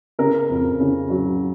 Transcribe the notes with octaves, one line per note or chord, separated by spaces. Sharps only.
C#3 A#4
F2
C#3
F#3